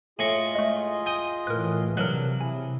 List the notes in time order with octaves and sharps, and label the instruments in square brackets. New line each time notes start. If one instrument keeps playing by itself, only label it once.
[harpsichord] A2 C#6 [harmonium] F4 G#4 D#5 [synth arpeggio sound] G#5 A#6
[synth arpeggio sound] G#3 A3
[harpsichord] G5 D#6 [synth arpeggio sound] G#5 A#6
[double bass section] A2 E3 [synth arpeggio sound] A#4 B4
[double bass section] C3 [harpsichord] F#3 [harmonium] D4 F5 [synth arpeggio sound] A#4 B4
[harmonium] E4 G#4 [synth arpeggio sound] G#5